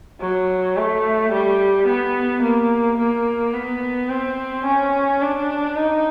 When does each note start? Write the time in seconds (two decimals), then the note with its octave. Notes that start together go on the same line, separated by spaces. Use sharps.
0.21 F#3
0.77 A3
1.32 G3
1.88 B3
2.43 A#3
2.98 A#3
3.54 B3
4.09 C4
4.65 C#4
5.22 D4
5.76 D#4